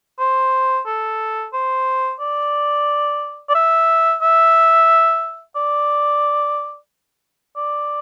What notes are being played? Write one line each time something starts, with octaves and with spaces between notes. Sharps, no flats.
C5
A4
C5
D5
D5
E5
E5
D5
D5